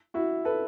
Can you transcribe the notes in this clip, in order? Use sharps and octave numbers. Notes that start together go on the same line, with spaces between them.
E4 F#4
A4 B4